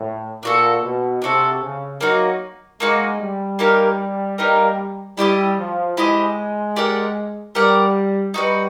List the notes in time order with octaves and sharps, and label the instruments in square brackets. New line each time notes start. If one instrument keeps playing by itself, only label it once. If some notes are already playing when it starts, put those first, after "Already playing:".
Already playing: [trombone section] A2
[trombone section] A#2 [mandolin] D4 F#4 A4
[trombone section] B2
[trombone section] C3 [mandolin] D4 F#4 A4
[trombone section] C#3
[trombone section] F#3 [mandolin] A#3 D#4 F#4
[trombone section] G#3 [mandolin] A#3 D#4 F#4
[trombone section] G3
[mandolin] A#3 D#4 G4 A#4
A#3 D#4 G4 A#4
[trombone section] G3 [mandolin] E4 G4 C5 D#5
[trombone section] F3
[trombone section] G#3 [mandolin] E4 G4 C5 D#5
[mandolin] G4 A#4 D5 F#5
[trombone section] G3 [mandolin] G4 A#4 D5 F#5
[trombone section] G3 [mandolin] D#4 F#4 B4